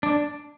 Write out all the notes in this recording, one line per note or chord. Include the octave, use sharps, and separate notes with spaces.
D4